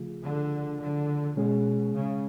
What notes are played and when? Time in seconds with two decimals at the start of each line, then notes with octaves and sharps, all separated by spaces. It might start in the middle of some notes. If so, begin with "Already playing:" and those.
Already playing: C#3 F3 A3 F4 G#4
0.24 D3
0.80 D3
1.37 B2 G#3 C#4 G#4
1.93 C#3